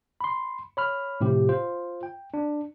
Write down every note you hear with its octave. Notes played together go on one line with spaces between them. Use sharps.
B5 C6
C#5 B5 F6
A2 C3 F3 G4
F4 C5
G5
D4